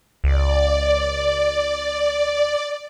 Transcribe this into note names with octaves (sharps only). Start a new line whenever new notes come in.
C#2 D5